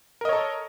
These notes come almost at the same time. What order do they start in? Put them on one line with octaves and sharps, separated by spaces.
A#4 D#5 C#5 A4